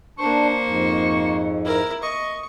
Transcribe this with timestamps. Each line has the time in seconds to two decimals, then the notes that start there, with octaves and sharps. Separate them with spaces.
0.19 A#3 D4 C5 C#6
0.63 F2 G#2
1.64 E4 A#4
2.03 D#5 C#6